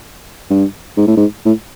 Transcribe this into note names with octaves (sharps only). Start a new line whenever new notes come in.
G2
G#2
A2
G#2
A2